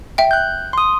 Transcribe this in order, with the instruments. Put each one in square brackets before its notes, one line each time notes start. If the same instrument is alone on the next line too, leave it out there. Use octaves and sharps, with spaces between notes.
[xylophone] E5 G5
[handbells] F#6 G6
C6 D#6